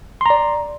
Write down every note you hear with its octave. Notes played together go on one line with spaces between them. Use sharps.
D5 A#5 C6